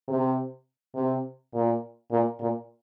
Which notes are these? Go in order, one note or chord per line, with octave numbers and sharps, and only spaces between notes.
C3
C3
A#2
A#2
A#2